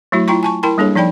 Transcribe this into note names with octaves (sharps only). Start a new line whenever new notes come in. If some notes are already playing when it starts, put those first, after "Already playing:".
F#3 A3 E4 F#4
E4 F4 G5 A#5 C#6
G#5 A5 C#6
E4 A#4 G5 A5 B5 C6
G3 A#3 D4 G#4 A4 C#5
F3 D#4 D5 G5 B5